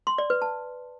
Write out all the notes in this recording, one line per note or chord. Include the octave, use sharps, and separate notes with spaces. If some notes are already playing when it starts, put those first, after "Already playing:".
C6
D5
B4
A5